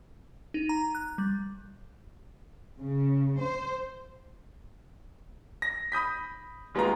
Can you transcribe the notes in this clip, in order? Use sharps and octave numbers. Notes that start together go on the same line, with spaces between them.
D#4
A#5
F#6
G3
C#3
C5
A#6
B5 D#6 G6 B6
D#2 G#3 B3 F4 A#5